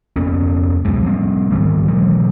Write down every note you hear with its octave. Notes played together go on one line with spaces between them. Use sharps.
F2 A#3 B3 C#4
C#2 F#2 B2 G#3
F3 G3 C4
G#2 D#3 G3 A#3
B2 E3 F#3 G#3